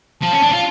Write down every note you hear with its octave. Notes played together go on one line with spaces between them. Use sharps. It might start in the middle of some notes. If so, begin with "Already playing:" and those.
F3 A5
C#4
D4
F4